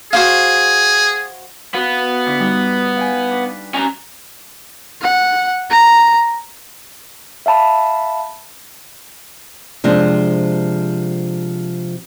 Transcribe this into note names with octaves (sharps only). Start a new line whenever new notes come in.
F#4 G#4 C5 F5
B3 F#4 B4 F5
D3 D4 E4
G3 D#4
F5 G5 G#5
D4 B4
C#4 A#5
F#5
A#5
E5 F5 A5 B5
C3 F3 G#3 C4 D4